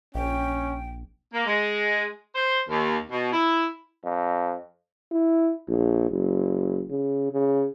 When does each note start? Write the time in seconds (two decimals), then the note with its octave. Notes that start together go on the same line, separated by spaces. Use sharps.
0.15 A#1 C#4 G5
1.34 A#3
1.46 G#3
2.35 C5
2.69 D#2
3.10 B2
3.32 E4
4.05 F2
5.11 E4
5.69 A#1
6.11 F#1
6.90 C#3
7.31 C#3